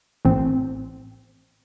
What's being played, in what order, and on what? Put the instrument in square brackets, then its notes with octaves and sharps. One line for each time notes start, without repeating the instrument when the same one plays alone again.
[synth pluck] A1 C4